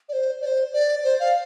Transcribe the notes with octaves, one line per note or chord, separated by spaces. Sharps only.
D5
C5
D5
C5
D5
C5
F5